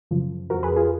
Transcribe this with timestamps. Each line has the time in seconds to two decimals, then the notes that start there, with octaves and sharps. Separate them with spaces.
0.11 F#2 C#3 F3
0.50 F3 F#4 A#4
0.55 F2
0.63 G#4 B4
0.76 F4 G#4